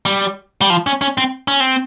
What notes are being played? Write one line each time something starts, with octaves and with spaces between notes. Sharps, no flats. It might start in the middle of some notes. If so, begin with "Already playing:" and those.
G3
G3
F3
C#4
C#4
C4
C#4
C4